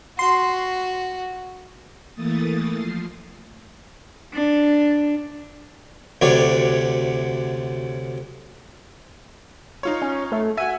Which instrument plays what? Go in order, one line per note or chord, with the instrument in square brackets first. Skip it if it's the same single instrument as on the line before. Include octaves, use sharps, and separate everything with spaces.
[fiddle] F#4 [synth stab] C6
[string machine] E3 A3 A#3 D#6 A6
F3 C7
[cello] D4
[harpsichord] D2 C3 F#3 C#5 D5
[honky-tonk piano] D#4 F4 C#5
[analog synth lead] C#4
A3
[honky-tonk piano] F#4 E5 [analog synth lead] G#5